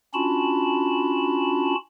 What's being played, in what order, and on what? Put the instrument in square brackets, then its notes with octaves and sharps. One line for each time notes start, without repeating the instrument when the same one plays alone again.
[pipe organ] C#4 D4 F4 F#4 A5 B5